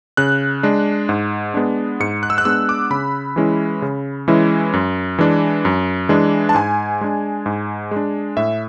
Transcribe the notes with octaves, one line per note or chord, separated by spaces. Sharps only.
C#3 F#6
G#3 D4
G#2
G#3 B3 D4
G#2 C#7
F#6
E6
F#6
G#3 B3 D4 E6
D6
C#3 B5
E3 G#3 C#4 E4
C#3
E3 G#3 C#4 E4
F#2
E3 G#3 D4
F#2
E3 G#3 D4
A5
G#2 G#5
G#3 D4
G#2
G#3
D4
A2 E5